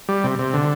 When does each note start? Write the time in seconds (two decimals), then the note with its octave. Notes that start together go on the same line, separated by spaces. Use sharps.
0.09 G3
0.24 C3
0.39 C3
0.53 D3